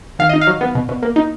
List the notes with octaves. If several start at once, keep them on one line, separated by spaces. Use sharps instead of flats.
D#3 F5
D#4 D#5
F5
F#3
B3
B2
B2
A#3
D#4